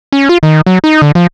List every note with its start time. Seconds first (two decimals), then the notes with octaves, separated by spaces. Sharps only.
0.13 C#4
0.29 F4
0.43 D#3
0.66 F#3
0.84 D#4
1.02 D3
1.15 F3